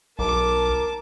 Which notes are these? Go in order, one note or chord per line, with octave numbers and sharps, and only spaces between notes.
B1 A#4 A5 D6